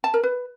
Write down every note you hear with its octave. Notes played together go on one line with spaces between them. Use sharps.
A5
A#4
B4